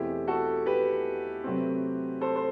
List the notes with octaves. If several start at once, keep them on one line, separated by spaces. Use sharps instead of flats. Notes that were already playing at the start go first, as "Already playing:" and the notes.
Already playing: E2 B2 A3 C4 E4 G4
F#4 A4
G4 B4
C3 F#3 A3 C4
A4 C5
C5